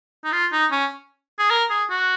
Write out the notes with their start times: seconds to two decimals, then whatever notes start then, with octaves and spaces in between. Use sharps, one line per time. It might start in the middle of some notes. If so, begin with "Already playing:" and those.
0.24 D#4
0.32 F4
0.52 D#4
0.71 C#4
1.39 G#4
1.51 A#4
1.70 G#4
1.90 F#4